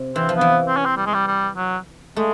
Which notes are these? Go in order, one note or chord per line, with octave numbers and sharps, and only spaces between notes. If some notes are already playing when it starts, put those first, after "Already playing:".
Already playing: C3
E3 C4
F3
E3 B3
C4
C#4
C4
G3
G#3
G3
G3
F#3
G#3 A3